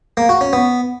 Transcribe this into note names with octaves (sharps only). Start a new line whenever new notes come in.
A#3
F#4
C#4
B3